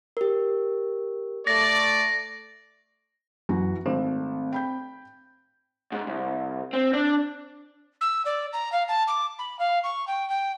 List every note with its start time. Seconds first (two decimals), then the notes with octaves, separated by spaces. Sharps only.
0.17 G4 A#4
1.47 A3 D5 A#6
3.49 F#2 E3 F#4
3.86 G#1 A3 C4
4.53 G5 B5 G6
5.92 G#2
6.07 C2
6.73 C4
6.93 D4
8.01 E6
8.25 D5
8.52 A#5
8.72 F5
8.88 A5
9.07 D6
9.38 B5
9.59 F5
9.83 C#6
10.07 G5
10.29 G5